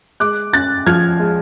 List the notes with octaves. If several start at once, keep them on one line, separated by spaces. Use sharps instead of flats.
G#3 D6 F#6
C#4 F#6 A6
F3 F6 G#6
G#3